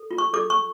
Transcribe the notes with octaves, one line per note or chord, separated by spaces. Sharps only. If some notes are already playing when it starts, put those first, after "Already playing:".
Already playing: A4
F4
C#6
A4 D6
C#6